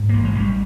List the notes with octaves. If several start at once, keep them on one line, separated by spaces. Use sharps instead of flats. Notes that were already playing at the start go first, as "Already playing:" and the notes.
Already playing: G#2
A1 A#3
G#3
A1
G3